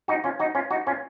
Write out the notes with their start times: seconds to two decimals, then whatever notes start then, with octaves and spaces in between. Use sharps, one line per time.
0.08 D#4 F#4
0.24 C#4 F4
0.39 D#4 F#4
0.55 C#4 F4
0.71 D#4 F#4
0.87 C#4 F4